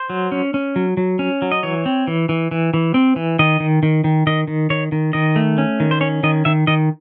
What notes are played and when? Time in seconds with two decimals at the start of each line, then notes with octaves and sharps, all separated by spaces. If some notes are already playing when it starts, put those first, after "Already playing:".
Already playing: C5
0.10 F#3
0.32 C#4
0.54 C#4
0.76 F#3
0.97 F#3
1.19 C#4
1.42 F#3
1.52 D#5
1.63 E3 C#5
1.86 C4
2.07 E3
2.29 E3
2.51 E3
2.74 E3
2.94 C4
3.16 E3
3.39 D#3 D#5
3.60 D#3
3.83 D#3
4.04 D#3
4.27 D#3 D#5
4.48 D#3
4.70 D#3 C#5
4.92 D#3
5.13 D#3 D#5
5.36 A3
5.58 C#4
5.80 D#3
5.91 C5
6.01 C#4 C#5
6.23 D#3 D#5
6.45 D#3 E5
6.67 D#3 D#5